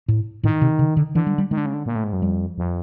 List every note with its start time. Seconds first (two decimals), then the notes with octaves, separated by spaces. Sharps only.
0.08 A2
0.43 A2 D#3
0.61 C3
0.79 C#3
0.97 D3
1.15 D3 E3
1.27 G3
1.38 G3
1.51 D#3 G#3
1.58 D3
1.66 C#3
1.74 D3
1.86 A#2
1.95 A2
2.04 G#2
2.13 F#2
2.21 F2 G3
2.58 F2